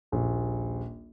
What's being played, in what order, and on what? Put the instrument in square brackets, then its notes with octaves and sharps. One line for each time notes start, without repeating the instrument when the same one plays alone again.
[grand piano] D#1 A#1